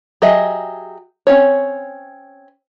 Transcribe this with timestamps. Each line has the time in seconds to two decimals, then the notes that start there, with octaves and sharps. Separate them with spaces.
0.22 F#3 G4 G#4 D#5 E5
1.27 C4 C#4 C#5